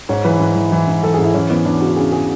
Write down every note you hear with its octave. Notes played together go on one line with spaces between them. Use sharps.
G#2 C#5
E3 B4
G#2
E3
E3
G#2
E3 A4
G#4
G#2
E4
E3 C#4
E3 B3
E2 D4
C#3 F#4
C#3 G#4
C#3 G#4